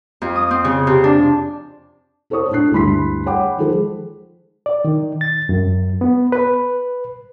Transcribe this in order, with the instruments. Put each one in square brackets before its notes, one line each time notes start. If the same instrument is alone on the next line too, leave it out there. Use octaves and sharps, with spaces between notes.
[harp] F2
D#6
C4
C#3
C3
D4
[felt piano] E4 A4 C5 C#5 C#6 D#6
A2 D4 F#6 C7
D2 G2 E4 B5 C6 B6
C#5 F#5 G5 B5 D6
D#3 F3 G#3 G#4 A4 C5
[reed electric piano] D5
D#3
A6
F#2
B3
B4